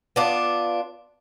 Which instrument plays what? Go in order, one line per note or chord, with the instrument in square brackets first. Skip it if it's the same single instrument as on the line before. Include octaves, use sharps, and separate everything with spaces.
[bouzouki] B3 D4 F4